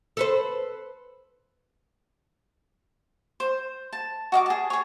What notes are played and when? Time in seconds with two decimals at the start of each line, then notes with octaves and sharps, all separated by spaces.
0.17 A4 B4 C5
3.40 C5
3.93 A5
4.32 F#4 D#5 F5 D6
4.46 G#4 A5
4.70 G#4 C#5